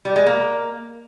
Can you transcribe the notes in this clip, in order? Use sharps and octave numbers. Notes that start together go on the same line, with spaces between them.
G3
G#3
A#3